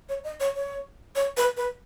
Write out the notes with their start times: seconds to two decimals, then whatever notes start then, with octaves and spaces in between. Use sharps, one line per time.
0.09 C#5
0.24 D#5
0.40 C#5
0.55 C#5
1.16 C#5
1.37 B4
1.57 B4